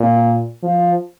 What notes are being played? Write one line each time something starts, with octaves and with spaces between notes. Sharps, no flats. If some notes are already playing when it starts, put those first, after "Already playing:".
Already playing: A#2
F3